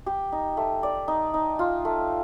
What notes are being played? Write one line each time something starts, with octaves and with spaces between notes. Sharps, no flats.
G4
D#4
A3
D5
D#4
D#4
F4
A3